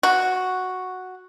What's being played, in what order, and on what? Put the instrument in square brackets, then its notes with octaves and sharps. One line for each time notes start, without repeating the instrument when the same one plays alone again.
[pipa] F#4